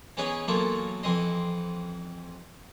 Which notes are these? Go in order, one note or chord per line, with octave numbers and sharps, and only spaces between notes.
E3 B3 C#4 D#4 G#4 B4
E3 F#3 A#3 B3 F4 A4
F2 E3 C4 D#5 C6